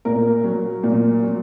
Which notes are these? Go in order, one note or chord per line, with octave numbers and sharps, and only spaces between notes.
A#2 A#4
F#3
A#2
F#3